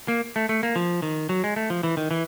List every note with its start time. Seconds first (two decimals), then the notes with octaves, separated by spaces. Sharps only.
0.08 A#3
0.36 A3
0.49 A3
0.63 A#3
0.76 F3
1.02 D#3
1.29 F#3
1.44 G#3
1.56 A3
1.70 F3
1.83 E3
1.97 D#3
2.11 E3